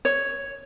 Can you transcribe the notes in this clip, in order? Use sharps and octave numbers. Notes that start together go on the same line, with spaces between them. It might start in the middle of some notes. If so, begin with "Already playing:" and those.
C#5